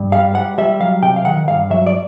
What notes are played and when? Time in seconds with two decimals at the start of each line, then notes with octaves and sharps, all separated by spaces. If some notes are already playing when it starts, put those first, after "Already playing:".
Already playing: G2
0.12 G3 F5
0.35 G3 F#5
0.58 G3 E5
0.80 F#3 F5
1.02 C3 G5
1.16 F5
1.25 D#3 F#5
1.48 G2 F5
1.70 F#3 E5
1.86 D5